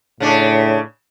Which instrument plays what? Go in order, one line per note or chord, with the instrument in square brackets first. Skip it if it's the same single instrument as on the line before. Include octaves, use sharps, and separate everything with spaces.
[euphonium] A2 [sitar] C#3 D4